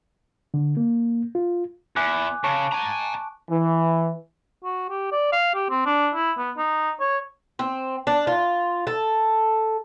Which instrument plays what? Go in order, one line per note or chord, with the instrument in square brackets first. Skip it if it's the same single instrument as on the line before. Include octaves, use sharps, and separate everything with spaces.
[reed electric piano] D3
A#3
F4
[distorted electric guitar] E2 [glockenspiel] G#5 D6 F#6
[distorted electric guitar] C#3 [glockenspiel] A5 C#6 D7
[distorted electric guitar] G#5 A#5
[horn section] E3
[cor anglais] F#4
G4
D5
F5
G4
C4
D4
E4
B3
D#4
C#5
[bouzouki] C4
D4
F4
A4